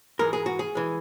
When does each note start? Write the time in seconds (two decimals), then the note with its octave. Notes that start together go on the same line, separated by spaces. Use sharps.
0.19 G#2 E3 G#3 A#4
0.33 G#4
0.46 F#4
0.59 G#4
0.75 E3 G#3